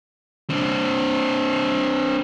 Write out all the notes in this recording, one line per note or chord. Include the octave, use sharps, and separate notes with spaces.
C4 D4